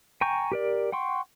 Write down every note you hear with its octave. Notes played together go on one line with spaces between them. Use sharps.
G5 G#5 A#5 C#6 G6
G4 A#4 D5
F#5 G5 C6 C#6